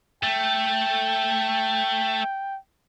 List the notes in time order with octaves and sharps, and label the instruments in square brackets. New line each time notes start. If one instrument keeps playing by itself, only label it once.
[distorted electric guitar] A3 [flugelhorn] G5